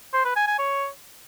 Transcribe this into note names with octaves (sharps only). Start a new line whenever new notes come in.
C5
B4
G#5
G#5
C#5